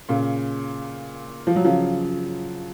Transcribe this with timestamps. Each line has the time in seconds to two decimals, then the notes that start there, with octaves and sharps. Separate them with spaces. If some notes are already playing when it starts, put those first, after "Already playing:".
0.09 A#2 C#3
1.47 F3
1.56 F#3
1.64 C#3 F3